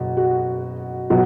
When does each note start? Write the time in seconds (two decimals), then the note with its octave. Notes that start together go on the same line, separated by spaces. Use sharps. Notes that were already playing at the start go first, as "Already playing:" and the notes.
Already playing: F#1 B2
0.17 F#4
1.10 B2 F#3